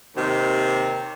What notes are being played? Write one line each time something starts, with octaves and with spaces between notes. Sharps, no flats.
D#2 C3 D#3